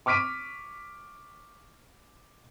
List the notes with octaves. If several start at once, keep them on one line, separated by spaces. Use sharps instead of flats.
C#6 D6 F6 B6 D7 D#7